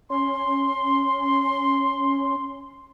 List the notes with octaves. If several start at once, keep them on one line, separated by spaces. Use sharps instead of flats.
C#4 C6